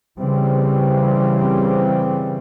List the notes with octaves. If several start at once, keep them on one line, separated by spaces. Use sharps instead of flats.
C#3 E3 G3 C4